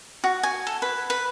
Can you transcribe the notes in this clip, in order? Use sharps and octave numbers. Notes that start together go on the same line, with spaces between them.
F#4
G#5
A4
B4
B4